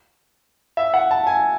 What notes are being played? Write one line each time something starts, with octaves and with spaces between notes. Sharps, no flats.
E5
F#5
A5
G#5